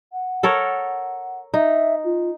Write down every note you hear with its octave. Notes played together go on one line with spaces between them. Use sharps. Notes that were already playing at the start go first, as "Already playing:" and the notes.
F#5
A4 A#4 C#5
D#4 E5
F4